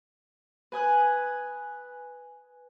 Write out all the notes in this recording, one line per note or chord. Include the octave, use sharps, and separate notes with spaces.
B4 G#5 D#6 F#6